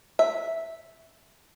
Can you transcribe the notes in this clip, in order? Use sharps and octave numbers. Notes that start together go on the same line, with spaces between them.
E5